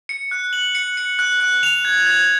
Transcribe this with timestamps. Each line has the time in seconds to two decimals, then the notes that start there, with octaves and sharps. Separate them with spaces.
0.09 C#7
0.31 F#6
0.53 F#7
0.75 C#7
0.97 C#7
1.19 F#6
1.40 F#6
1.63 F7
1.85 G#6
2.06 G#6